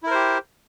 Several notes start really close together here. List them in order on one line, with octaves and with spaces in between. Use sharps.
E4 A#4 C5 G4